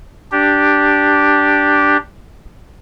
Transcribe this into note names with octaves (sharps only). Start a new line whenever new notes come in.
D4 G4